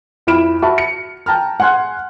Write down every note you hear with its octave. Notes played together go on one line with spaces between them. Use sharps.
F2 E4 B5 F6 D7 E7
F#4 E5 A5 B5
C#7
G5 A5 A#5 F6
F#5 G#5 C6 F6 F#6